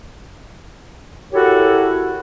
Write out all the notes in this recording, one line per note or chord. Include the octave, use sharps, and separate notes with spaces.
E4 F#4 G4 A4 A#4 C#5